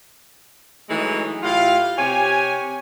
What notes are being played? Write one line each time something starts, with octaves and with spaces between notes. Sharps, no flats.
E3 F#3 G#3 A3 C#4 D#4
A2 E4 F4 G4 F5
C3 G4 C#5 G#5